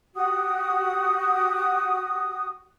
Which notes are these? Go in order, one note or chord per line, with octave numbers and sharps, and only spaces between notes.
F#4 G4 D#6